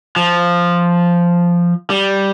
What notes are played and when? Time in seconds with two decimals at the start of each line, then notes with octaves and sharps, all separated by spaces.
0.16 F3
1.90 G3